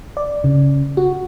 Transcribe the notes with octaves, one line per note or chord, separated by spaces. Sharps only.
D5
C#3
F#4